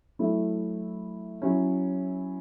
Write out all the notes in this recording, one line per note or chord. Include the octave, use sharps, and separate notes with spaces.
F#3 A3 E4
F#3 C#4 E4